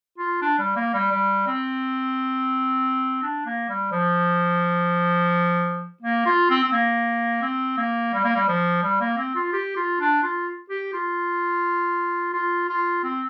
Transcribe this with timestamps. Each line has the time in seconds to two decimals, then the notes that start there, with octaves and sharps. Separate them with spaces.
0.18 F4
0.42 D4
0.59 G3
0.76 A#3
0.94 G3
1.11 G3
1.47 C4
3.22 D4
3.46 A#3
3.69 G3
3.92 F3
6.02 A#3
6.26 F4
6.50 C4
6.64 C4
6.72 A#3
7.42 C4
7.78 A#3
8.13 G3
8.24 A#3
8.36 G3
8.48 F3
8.83 G3
9.01 A#3
9.17 C4
9.35 F4
9.53 G4
9.76 F4
10.00 D4
10.23 F4
10.70 G4
10.93 F4
12.34 F4
12.69 F4
13.03 C4